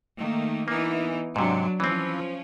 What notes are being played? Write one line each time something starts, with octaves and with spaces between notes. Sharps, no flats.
D#3 A3 A#3
E3 A#3 B3 D#4
G#2 C3 F#3 D4
E3 F3 C4 C#4